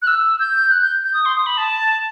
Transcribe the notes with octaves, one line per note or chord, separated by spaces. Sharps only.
F#6
E6
G6
F#6
G6
G6
D#6
C6
D#6
B5
A5